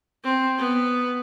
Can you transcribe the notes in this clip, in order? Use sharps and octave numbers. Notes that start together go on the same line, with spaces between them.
C4
B3